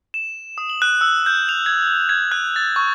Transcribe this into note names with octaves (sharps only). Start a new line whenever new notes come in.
E7
D#6
F#7
F#6
E6
G6
F7
G#6
G#6
F#6
A6
C#6